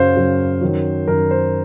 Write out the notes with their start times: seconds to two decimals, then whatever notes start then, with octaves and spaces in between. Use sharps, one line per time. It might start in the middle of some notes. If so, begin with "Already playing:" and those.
Already playing: F#2 C#3 F#3 C5 F5
0.16 F#2 C#3 F#3
0.61 F#2 D#3 F#3
1.07 F#2 D#3 F#3 A#4
1.31 C5